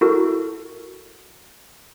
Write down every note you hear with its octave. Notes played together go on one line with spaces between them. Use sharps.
E4 F#4 A4 A#4